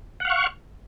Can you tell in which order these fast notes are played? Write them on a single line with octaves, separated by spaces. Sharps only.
F#5 F5 C#6